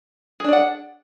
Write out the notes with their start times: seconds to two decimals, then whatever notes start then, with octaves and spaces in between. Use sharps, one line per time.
0.40 G#4
0.44 D4
0.48 D5
0.53 F#5